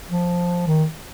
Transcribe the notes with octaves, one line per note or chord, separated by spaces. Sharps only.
F3
D#3